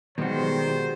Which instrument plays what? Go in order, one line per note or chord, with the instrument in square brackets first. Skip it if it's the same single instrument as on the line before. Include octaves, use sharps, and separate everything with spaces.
[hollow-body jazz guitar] B2 F#4 [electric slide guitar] D#3 [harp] G3 G#3 [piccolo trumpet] C5